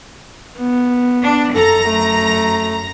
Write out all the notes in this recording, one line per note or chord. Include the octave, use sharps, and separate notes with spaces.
B3
D4
F#2 A4 A#5 A#6
A3